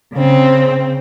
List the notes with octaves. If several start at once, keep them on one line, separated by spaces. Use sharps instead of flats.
C#3 C4